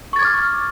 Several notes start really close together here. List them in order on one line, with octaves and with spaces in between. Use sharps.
C#6 A6 G#6 D6 F6